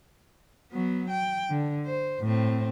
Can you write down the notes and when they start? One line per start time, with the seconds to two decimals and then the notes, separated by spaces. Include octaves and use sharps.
0.72 F#3 B3
1.10 G5
1.50 D3
1.85 C5
2.22 A2 C4